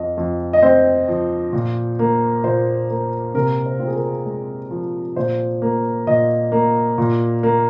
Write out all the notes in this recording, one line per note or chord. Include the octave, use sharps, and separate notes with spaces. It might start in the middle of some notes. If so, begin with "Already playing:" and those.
Already playing: F2 D#5
F2
D#5
C4 C5
F3
A#2
A#3
A#2 C5
A#3
C3 A#4
C5
C4 F4
G#4
A#4
G#3
F3
A#2 C5
A#3
A#2 D#5
A#3
A#2
A#3